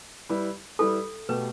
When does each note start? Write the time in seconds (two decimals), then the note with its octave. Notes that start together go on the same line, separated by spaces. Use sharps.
0.29 G3 E4 B4
0.79 G3 E4 A4 B4
1.29 B2 A3 G4 B4